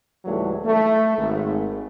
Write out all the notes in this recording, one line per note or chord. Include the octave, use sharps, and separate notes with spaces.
C#2 G#2 E3 F#3 G3 A3
A3
G#1